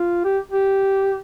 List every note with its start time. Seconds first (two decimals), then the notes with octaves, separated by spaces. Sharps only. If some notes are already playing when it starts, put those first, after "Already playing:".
Already playing: F4
0.25 G4
0.51 G4